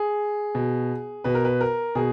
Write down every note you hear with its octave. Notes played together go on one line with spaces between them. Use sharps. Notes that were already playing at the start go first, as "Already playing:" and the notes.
Already playing: G#4
B2
B2 B4
A#4
B4
A#4
B2 G#4